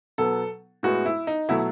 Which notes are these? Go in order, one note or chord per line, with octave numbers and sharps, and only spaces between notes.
B2 F#3 B3 A4
A2 G#3 B3 F#4
E4
D#4
B2 F#3 A3 E4